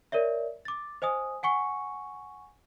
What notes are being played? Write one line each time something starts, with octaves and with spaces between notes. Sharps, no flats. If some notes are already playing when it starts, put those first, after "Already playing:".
A#4 C#5 D5 E5
D6 A6
C5 D#5 G#5 D#6
F#5 G#5 C#6 C#7